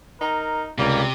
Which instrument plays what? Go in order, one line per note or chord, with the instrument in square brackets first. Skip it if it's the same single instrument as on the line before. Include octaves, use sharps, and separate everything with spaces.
[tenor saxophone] D#4 [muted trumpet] A#4
[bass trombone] C#2 [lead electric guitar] C3 [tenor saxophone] G3 [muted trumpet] A#3